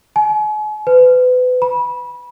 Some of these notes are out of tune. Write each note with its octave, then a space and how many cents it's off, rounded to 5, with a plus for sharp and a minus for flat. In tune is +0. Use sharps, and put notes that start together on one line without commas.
G#5 +40
B4 +30
B5 -25